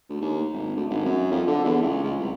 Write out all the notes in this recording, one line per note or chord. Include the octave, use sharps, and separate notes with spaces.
D2
D#2
G#1
D2
G#1
F#2
F2
D3
E2
C#2
C#2
C2